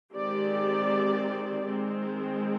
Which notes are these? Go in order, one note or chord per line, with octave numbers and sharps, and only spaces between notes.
D#3 G#3 C4 G4 D5
D#3 G#3 C4